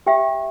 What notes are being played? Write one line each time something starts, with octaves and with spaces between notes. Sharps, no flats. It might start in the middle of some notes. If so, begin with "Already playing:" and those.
G4 E5 G5